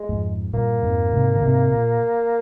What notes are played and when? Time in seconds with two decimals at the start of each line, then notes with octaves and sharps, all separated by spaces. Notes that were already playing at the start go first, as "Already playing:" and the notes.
Already playing: G#3
0.09 F2 G#2
0.53 G2 A#2 A#3
0.82 F2 G#2
1.13 G#2 C3
1.35 D3
1.42 G#2 C3
1.71 A#2